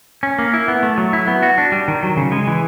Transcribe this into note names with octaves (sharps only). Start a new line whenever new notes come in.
C#4
A#3
E4
B3
A3
F#3
E4
B3
F#4
D4
G3
D#3
F#3
C#3
G#3
E3